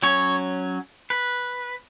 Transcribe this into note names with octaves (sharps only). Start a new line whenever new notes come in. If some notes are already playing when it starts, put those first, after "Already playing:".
F#3 C#4 C#5
B4